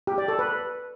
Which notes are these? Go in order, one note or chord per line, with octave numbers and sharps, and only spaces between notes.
G4
D5
A4
B4